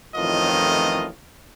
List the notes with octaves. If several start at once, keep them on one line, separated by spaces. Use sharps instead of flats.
A1 F2 A2 D#3 F4 D#5